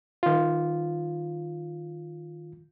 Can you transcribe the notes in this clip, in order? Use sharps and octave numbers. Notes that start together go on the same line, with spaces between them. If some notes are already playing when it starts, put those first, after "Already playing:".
D#3 F4